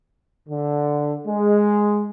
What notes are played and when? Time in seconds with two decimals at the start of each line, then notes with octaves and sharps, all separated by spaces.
0.49 D3
1.27 G#3